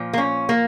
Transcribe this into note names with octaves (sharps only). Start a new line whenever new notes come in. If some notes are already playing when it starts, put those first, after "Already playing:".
Already playing: A#2 F3
A#3
C#4
A#3